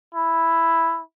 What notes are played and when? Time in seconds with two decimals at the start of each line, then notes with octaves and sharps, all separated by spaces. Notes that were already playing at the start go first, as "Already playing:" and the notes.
0.14 E4